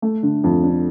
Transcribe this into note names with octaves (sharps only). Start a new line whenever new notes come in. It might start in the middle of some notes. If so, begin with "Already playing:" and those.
A3
D3
F2
D4